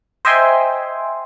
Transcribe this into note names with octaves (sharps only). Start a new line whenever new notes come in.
C5 D#5 E5 G5 G#5 C6